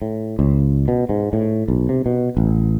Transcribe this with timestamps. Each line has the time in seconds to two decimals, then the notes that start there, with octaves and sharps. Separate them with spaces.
0.02 A2
0.39 C#2
0.88 B2
1.09 G#2
1.33 A2
1.68 B1
1.89 C3
2.06 B2
2.37 A1